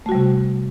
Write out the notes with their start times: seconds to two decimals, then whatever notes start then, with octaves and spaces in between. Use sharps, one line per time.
0.06 A3
0.09 F#4
0.12 G3
0.15 C3